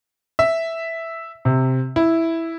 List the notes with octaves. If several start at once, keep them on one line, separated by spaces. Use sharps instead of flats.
E5
C3
E4